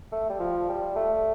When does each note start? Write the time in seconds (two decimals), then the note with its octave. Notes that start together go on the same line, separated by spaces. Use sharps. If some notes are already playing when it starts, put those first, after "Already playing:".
0.12 A3
0.30 G3
0.40 F3
0.69 G3
0.96 A3